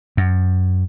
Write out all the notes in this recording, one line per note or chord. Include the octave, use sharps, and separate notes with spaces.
F#2